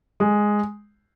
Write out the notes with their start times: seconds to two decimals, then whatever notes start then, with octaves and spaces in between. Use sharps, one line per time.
0.20 G#3